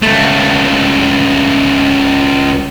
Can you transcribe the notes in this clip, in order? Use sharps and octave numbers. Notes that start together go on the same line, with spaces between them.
C#2 A3